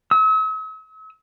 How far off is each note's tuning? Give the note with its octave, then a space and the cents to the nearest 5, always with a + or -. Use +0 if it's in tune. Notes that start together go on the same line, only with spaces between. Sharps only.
E6 -45